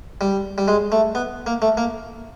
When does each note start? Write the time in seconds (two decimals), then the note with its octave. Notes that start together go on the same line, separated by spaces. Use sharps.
0.21 G3
0.58 G3
0.68 G#3
0.92 A3
1.15 B3
1.47 A#3
1.62 A3
1.77 A#3